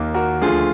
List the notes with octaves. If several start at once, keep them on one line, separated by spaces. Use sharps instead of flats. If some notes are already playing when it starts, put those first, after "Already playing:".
Already playing: D#2 D#3 A#3
F#4 A#4
D2 D3 F3 F4 G#4